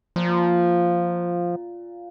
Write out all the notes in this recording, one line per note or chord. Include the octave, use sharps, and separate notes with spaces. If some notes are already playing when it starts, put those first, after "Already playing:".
A#2 F3